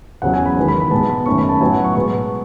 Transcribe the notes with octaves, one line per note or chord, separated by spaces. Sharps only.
E2 C#3 F#3 F#5
G#5
B5
E2 D#3 G#3 B3
B5
B5
B2 G#3 B3 A5
B5
F#2 D#3 A3 C#4 C#6
B5
A5
A2 F#3 B3 G#5
F#5
C#6
B2 G#3 B3 C#6